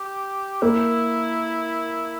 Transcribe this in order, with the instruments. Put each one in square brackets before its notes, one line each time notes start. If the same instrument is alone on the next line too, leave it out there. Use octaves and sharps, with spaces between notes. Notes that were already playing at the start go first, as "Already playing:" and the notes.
Already playing: [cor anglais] G4
[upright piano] A#3 [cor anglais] E4